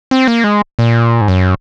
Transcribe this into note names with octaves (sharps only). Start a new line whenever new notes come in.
C4
A#3
G#3
A#2
G#2
F#2